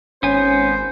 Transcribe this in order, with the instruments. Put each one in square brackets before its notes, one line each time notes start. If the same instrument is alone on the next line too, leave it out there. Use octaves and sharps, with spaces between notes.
[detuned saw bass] G#1 [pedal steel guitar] B3 G#5 [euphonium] C#4 [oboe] C5